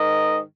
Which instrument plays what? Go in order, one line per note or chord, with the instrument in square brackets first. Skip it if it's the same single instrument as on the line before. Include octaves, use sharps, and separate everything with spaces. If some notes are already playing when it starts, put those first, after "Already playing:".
Already playing: [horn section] G#2 D#3 A#4 D#5